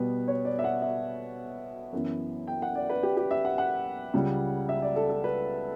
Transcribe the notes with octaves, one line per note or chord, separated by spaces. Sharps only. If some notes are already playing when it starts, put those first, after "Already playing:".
Already playing: B2 G3 B3 B4
C#5
D5
E5
F#5
E5
F#2 E3 B3
G5
F#5
D5
B4
G4
G4
E5
F#5
F#5
C#2 C#3 G3
E5
D5
A4
A4
B4